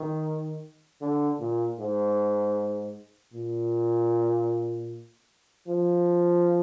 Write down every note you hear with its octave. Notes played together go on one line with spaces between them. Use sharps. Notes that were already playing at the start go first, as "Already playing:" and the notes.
Already playing: D#3
D3
A#2
G#2
A#2
F3